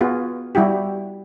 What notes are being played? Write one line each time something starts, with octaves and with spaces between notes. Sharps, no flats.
B3 F4 F#4 G#4
G3 E4 F#4 G4